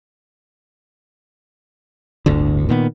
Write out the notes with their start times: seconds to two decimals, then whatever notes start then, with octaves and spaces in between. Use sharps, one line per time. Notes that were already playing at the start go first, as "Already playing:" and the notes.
2.26 D1 G1 D2 D3
2.69 A#2 D#3 B3